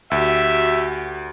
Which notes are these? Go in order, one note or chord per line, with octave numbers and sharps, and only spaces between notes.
D2 F#4 G4 E5